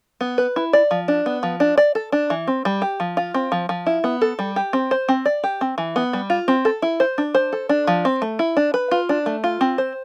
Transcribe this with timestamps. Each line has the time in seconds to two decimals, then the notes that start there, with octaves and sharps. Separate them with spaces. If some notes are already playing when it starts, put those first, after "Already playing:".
0.21 B3
0.38 B4
0.56 E4
0.73 D5
0.91 F3
1.08 D4
1.26 B3
1.43 F3
1.60 D4
1.78 D5
1.95 A4
2.12 D4
2.30 E3
2.48 C4
2.65 G3
2.82 G4
3.00 F3
3.17 F4
3.34 C4
3.52 F3
3.69 F3
3.87 E4
4.04 B3
4.21 A4
4.39 G3
4.56 G4
4.73 C4
4.91 C5
5.09 C4
5.26 D5
5.44 G4
5.61 C4
5.78 E3
5.96 B3
6.13 G3
6.30 F4
6.48 C4
6.65 A4
6.82 E4
7.00 C5
7.18 D4
7.35 C5
7.53 A4
7.69 D4
7.87 F3
8.05 C4
8.22 A3
8.39 E4
8.57 D4
8.74 B4
8.91 F4
9.09 D4
9.26 A3
9.44 F4
9.61 C4
9.78 C5